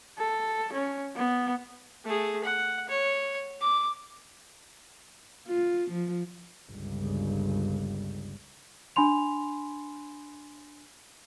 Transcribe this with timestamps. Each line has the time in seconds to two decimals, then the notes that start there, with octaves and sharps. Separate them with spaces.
0.18 A4
0.73 C#4
1.16 B3
2.04 A3 G#4
2.44 F#5
2.89 C#5
3.61 D6
5.48 F4
5.91 F3
6.72 G1 C#2
8.96 D4 G#5 B5 C6 F7